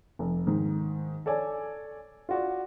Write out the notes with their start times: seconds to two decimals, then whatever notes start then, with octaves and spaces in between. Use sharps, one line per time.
0.19 F1
0.47 G#2 D#3
1.26 A4 C#5 D5 G#5
2.29 F4 F#4 D5